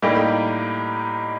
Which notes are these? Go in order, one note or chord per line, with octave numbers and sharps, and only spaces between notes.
A2 G3 A#3 D#4 G4